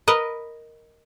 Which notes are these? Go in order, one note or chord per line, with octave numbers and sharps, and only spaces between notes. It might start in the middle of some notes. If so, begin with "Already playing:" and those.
A#4 B4 D#5